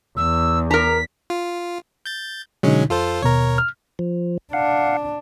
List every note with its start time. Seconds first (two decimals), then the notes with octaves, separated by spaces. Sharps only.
0.17 E2 E6
0.71 A#4 A#5 B6
1.30 F4
2.06 G6 A6
2.63 B2 D3 F#3 G#3 C#4 D#4
2.90 F2 F4 A4 C5
3.22 D#2 B2 A#4 C#5 A#5
3.58 F6
3.99 F3
4.53 D4 F5 F#5